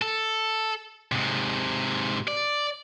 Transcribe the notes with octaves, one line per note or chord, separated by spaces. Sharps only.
A4
G#2 C3
D5